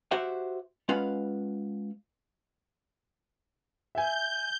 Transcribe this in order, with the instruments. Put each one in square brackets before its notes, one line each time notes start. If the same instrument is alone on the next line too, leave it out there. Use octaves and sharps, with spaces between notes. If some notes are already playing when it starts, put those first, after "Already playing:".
[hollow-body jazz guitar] F#4 G4 C5 E5 F#5
G#3 C#4 F4 B4 F5 F#5
[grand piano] E5 G#5 [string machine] G6